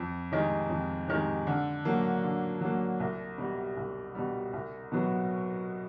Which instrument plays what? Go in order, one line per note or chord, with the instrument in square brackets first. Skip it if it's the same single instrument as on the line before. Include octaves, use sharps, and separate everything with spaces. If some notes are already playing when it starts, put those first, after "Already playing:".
Already playing: [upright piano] F2
C3 D#3 G#3
F2
C3 D#3 G#3
D3
F#3 A#3
D3
F#3 A#3
C2
B2 G3
C2
B2 G3
C2
B2 F#3 B3